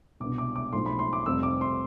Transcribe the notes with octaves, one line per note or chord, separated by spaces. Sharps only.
C2 B2 B3 D4 D6
D6
D6
B1 A2 F3 C4 C6
B5
C6
D6
F1 F2 C3 G3 E6
D6
C6